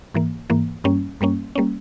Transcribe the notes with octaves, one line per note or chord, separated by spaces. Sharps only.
G#2 E3 A#3
G#2 E3 A#3
G2 G3 A#3 C#4
G2 G3 A#3 C#4
G3 A#3 C#4